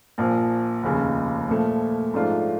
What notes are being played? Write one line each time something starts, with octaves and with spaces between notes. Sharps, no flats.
A#1 A#2 F3
F1 D#2 C#3
A#2 F3 A3
G#2 F3 A3 D4 F4